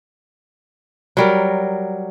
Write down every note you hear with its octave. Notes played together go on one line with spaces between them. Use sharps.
F#3 G3 A#4